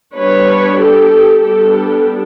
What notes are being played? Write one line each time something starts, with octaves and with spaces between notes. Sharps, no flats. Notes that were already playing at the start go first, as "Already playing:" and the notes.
G3 B3 D4 B4 C#5
G4 A4
G3 B3 D4 G4 A4